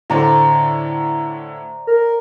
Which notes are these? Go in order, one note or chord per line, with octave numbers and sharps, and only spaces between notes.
A2 D3 C5 D5 A#5
A#4